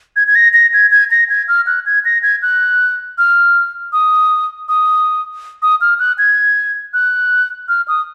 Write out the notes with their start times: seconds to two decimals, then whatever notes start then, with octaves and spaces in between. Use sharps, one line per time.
0.16 G#6
0.28 G#6
0.35 A#6
0.54 A#6
0.73 G#6
0.91 G#6
1.11 A#6
1.29 G#6
1.48 F6
1.67 F#6
1.86 G#6
2.05 A#6
2.23 G#6
2.42 F#6
3.18 F6
3.93 D#6
4.68 D#6
5.62 D#6
5.81 F6
5.99 F#6
6.18 G#6
6.94 F#6
7.68 F6
7.88 D#6